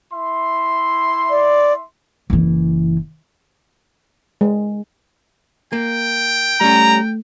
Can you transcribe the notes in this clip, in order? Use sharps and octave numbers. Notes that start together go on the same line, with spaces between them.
E4 E5 C6
D5
F#1 E3
G#3
A#3 G5
G3 A3 C#4 A#5